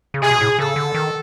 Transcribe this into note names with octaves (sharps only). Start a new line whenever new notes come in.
C#3
C3 G#4
B2
A2
C#3 A4
D3
D#3